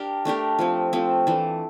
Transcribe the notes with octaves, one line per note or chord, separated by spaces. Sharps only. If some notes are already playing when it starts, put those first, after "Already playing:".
Already playing: D4 G4 A#4
A3 D4 G4 A#4
F3 A3 C4
F3 A3 C4
E3 A3 D4